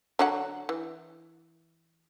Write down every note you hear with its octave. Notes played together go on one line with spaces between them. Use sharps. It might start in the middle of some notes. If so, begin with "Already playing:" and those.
D3 F#3 F#5
E3